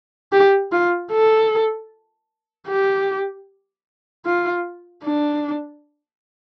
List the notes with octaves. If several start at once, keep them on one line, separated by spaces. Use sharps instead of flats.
G4
F4
A4
G4
F4
D4